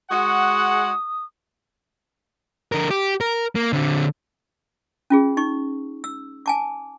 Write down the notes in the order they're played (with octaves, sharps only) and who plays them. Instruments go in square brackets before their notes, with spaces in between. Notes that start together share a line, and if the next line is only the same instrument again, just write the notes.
[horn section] G#3 F#4 F#5 [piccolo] D#6
[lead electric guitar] D3 A#4
G4
A#4
A#3
D3 C4
[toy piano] C#4 F4 G#4
D#4 C#6
E6
G#5 A5 D6